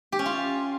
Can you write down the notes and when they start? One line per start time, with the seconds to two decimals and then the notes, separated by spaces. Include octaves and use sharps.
0.12 G4
0.19 C#4
0.26 F4